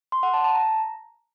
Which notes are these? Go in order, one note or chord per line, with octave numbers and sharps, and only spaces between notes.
C6
F#5
A5
A5
A#5